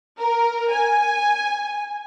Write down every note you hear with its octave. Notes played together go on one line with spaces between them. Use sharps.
A#4
G#5